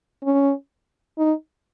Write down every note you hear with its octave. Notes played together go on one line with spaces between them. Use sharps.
C#4
D#4